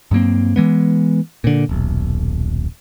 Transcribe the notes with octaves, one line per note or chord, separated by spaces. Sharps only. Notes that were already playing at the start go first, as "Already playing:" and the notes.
G2 F#3 A#3 C4
E3 G#3 B3
A#2 D3
D#1 B1